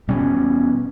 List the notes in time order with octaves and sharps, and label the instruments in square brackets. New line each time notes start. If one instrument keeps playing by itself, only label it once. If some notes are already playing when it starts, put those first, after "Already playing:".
[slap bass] E2 B2 G3 C#4